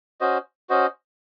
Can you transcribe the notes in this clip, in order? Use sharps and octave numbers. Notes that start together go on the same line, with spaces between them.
C#4 F#4 C5 D#5
C#4 F#4 C5 D#5